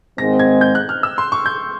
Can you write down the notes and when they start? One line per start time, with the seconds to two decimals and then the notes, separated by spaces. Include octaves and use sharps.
0.18 G#2 D#3 G#3 C4 A#6
0.39 G#6
0.61 G6
0.75 F#6
0.89 F6
1.03 E6
1.18 C6
1.32 C#6
1.46 G6